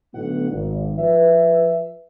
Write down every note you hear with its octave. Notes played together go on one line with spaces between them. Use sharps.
B1 A2 D3 A3 B3 F#5
G#1
F3 B4 E5